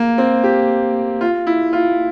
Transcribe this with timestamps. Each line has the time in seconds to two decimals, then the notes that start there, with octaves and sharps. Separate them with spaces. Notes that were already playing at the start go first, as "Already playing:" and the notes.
Already playing: A#3
0.18 C4
0.44 G4
1.21 F4
1.47 E4
1.73 F4